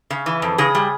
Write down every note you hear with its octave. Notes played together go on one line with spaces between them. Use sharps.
C#3
E3
F2
C#3 G#4
G3